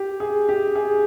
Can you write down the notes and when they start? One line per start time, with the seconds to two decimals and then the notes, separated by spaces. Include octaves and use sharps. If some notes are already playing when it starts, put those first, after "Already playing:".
Already playing: G4
0.20 G#4
0.49 G4
0.75 G#4